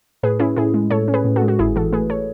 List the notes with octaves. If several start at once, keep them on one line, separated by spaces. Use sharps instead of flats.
A2 G#4 B4
C#4 E4 G#4
A2 E4 G#4
G#3
A2 A4 C#5
C#4
G#4 B4
A2
F#4 A4
G#3
F#4
G#1 E4 G#4
E3 F#4 A4
A3 G#4 B4
A4 C#5